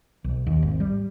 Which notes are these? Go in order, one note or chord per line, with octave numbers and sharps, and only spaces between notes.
B1
D#2
G#1
G3